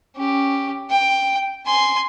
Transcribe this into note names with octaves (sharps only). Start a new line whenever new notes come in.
C#4 G4
G5
G#5 C6